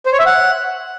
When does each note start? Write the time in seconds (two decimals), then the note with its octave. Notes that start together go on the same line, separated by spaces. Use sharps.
0.06 C5
0.13 C#5
0.19 E5
0.26 F#5